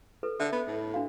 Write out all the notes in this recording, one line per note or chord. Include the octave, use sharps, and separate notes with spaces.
A4 B4
D3 E5
B3
A2
D4 F#4 F5